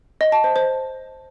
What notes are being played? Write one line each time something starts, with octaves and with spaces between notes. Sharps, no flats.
D#5
A5
C5
C5